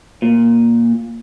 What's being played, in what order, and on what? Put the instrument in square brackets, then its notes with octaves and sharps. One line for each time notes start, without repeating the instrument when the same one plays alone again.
[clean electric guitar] A#2